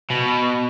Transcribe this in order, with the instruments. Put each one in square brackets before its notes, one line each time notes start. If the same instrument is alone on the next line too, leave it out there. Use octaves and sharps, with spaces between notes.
[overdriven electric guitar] B2